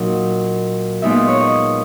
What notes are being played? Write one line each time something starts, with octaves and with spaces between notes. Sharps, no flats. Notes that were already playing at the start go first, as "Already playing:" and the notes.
Already playing: A#2 F#3 D#4
A#2 G#3 B3 D#4 E5
D#5
C#5
D#5